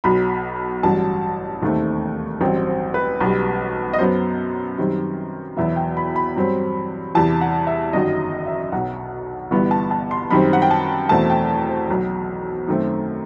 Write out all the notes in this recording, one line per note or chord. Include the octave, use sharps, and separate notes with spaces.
B1 B2 F#3 B5
A1 G2 F#3 A5
E1 D#2 D#3 A3 C4
A1 G2 F#3 C4 G5
C5
B4
B1 B2 G3
D#5
F#2 F#3 B3 C5
F#2 D#3 G3 C4
E2 B2 F#3 B3 E5
G5
B5
B5
G2 F#3 C4
E2 C3 E3 A5
F#5
E5
G1 F#2 D#3 F#3 D#5
E5
B1 B2 F#3 F#5
G1 G2 E3 B3
A5
A5
C6
F#2 D#3 G3 C4 B5
F#5
G5
A5
E2 B2 A3 C4 A5
G5
C5
B1 B2 F#3
F#2 D#3 A3 C4